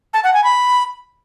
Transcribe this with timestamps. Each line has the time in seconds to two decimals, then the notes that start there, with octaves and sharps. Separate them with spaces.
0.14 A5
0.24 F#5
0.34 G#5
0.44 B5